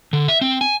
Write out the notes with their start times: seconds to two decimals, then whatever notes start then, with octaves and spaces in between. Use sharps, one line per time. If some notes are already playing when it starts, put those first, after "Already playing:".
0.13 D3
0.28 E5
0.41 C4
0.61 G#5